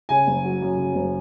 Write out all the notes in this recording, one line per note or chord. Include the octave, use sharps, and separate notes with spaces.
C#3 G#5
F#1
F#3
F#2
C#3
F#1